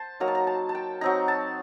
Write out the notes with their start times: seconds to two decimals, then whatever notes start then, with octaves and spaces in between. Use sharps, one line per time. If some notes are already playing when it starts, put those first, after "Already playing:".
Already playing: C5 A5
0.20 F#3 A#3 D#4 A#5
0.28 A5
0.35 A#5
0.47 A5
0.69 A5
0.75 G5
1.01 F#3 C4 D#4 A#5
1.28 A5